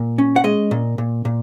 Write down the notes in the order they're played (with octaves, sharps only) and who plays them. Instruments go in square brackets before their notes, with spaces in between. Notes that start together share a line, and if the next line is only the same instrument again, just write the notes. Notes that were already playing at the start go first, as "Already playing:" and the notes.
Already playing: [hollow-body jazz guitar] A#2
C#4
F#5
G#3 D#5
A#2
A#2
A#2